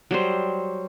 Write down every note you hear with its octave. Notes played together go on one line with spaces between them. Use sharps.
F#3 G3 C5